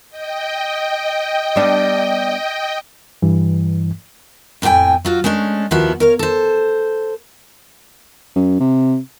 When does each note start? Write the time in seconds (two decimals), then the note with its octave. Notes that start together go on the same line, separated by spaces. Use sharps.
0.10 D#5 G5
1.56 G3 B3 D4
3.22 G2 E3
4.62 F2 A2 G4 G5 G#5
5.05 F#3 F4 F#4
5.24 G#3 A3 C#4 D4
5.71 D#2 F3 B3 E4 F#4
6.00 A#4 C#5 F5
6.19 A4 C5
8.36 F#2
8.60 C3